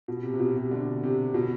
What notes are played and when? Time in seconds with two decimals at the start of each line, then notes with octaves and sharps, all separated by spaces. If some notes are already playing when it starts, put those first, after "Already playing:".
0.08 B2
0.23 C3
0.34 C3
0.40 B2
0.56 C3
0.71 D3
1.03 C3
1.34 B2